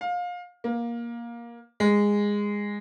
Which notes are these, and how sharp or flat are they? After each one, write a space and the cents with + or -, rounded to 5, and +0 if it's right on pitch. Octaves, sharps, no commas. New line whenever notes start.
F5 +25
A#3 +15
G#3 -15